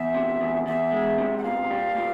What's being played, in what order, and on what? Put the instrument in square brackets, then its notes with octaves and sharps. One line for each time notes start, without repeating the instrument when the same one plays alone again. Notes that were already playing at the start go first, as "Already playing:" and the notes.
Already playing: [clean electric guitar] E2 [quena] E5
[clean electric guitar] C3
E2
[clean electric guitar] E2 [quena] E5
[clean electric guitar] G#3
C3
[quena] F#5
[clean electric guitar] A#2 [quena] F5
[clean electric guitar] G3
A#2